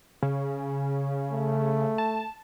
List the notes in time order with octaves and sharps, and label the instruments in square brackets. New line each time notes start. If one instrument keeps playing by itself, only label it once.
[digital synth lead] C#3
[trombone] A3
[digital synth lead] A5